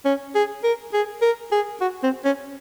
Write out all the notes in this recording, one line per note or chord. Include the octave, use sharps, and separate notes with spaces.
C#4
G#4
A#4
G#4
A#4
G#4
F#4
C4
C#4